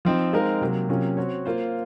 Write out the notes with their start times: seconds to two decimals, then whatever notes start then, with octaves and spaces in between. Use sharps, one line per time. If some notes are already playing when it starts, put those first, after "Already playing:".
0.05 F3 C4 D#4
0.33 G#3 C4 D#4 A#4 F5
0.61 C3 F#3 A#3
0.89 C3 F#3 A#3 C#4 F4
1.17 C4 F#4 C#5
1.45 A#3 F4 C5